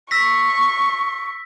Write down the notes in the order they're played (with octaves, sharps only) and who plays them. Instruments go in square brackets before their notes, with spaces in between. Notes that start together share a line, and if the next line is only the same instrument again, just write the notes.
[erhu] C#6 [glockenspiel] E6 A#6 B6